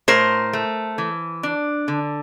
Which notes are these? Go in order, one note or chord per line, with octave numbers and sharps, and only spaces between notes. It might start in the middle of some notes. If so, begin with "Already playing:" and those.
A2 A#4 C5
A3
E3
D4
D3